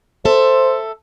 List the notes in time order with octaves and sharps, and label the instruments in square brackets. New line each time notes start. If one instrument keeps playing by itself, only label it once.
[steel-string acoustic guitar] A4 E5 [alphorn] C5